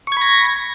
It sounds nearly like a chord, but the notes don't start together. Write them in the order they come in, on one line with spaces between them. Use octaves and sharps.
C#6 G#6 B5 A#6